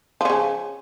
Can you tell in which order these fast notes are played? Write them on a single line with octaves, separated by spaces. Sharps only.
F3 C#4 C#3